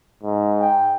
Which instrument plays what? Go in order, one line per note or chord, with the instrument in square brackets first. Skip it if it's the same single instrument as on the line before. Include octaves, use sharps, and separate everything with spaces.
[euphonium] G#2
[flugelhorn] G5